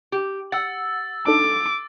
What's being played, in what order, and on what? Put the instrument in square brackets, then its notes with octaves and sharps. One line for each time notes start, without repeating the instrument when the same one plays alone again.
[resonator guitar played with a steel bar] G4
[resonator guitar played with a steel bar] F#5 [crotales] E6 A6
[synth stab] D4 D#4 A4 [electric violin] D6